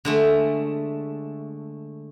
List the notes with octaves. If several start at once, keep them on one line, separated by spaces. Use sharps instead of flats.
D3 G#3 A3